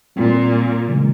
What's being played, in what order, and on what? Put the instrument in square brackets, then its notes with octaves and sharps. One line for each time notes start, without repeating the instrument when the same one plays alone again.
[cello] A#2 [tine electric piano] G3 C4 F4
[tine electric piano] C#3 E3 G#3